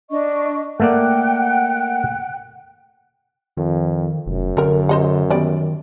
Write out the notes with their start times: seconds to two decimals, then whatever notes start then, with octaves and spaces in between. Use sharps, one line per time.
0.11 D4 D#5 C#6
0.80 A3 A#3 D5 F#5 G5 F#6
3.57 F2 D#3
4.27 F1 F#2
4.57 D3 A4 A#4
4.89 C5 D#5 F#5
5.30 D#3 G3 B3 D5